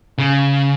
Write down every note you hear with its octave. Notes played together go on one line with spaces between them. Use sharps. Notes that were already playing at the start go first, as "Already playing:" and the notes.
C#3